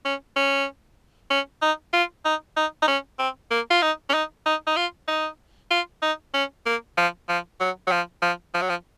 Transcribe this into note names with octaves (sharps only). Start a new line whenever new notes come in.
C#4
C#4
C#4
D#4
F4
D#4
D#4
D#4
C#4
C4
A#3
F4
D#4
C#4
D#4
D#4
D#4
F4
D#4
F4
D#4
C#4
A#3
F3
F3
F#3
F#3
F3
F3
F3
F#3
F3